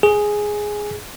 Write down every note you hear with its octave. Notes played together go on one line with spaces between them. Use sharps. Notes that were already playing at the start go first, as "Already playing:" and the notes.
G#4